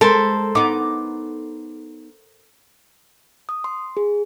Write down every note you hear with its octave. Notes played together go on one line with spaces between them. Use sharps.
G#3 A4 A#4 C5 B5
B3 D#4 D6
D#6
C6
G#4